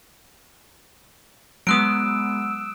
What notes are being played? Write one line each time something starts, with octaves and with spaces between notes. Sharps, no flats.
F#3 G#3 B3 D#6 E6 F#6 D7